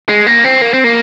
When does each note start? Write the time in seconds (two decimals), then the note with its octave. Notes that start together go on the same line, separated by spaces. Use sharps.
0.09 G#3
0.27 A#3
0.44 C4
0.62 A#3
0.74 C4
0.84 A#3